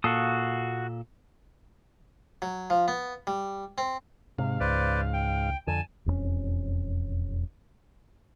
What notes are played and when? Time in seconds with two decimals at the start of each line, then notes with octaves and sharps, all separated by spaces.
0.04 A#2 F#4 A4 F5 D#6
2.42 F#3
2.70 F3
2.88 B3
3.27 G3
3.78 C4
4.38 G#2 C3 F5
4.60 C#2 B4 C5 D5
5.14 G5
5.67 F2 D3 G#5 A5
6.06 E1 F2 G#3 C#4